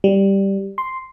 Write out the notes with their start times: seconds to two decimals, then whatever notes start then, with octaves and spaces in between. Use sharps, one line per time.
0.04 G3
0.78 C6